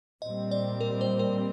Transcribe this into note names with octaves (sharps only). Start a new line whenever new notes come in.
A#2 G3 C4 D#5
D5
A#4
C5
A#4